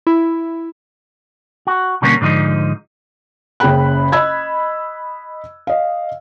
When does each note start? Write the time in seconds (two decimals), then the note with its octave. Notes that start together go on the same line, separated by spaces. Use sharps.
0.07 E4
1.67 F#4
2.02 B2 D3 G3 A#3 B3 C#4
2.21 G#2 D3 F3 D#4
3.60 F#1 C#3 G#4 G5 B5 F#6
4.12 D#5 B5 E6 G#6
5.67 D#5 F5